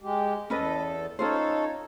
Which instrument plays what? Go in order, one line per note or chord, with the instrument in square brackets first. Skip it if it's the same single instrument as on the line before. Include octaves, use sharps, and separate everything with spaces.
[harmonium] G#3 G4
[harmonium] E2 A4 [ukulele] C#4 B4 D#5
[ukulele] C#4 F4 C5 [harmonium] D#4 A4 C#5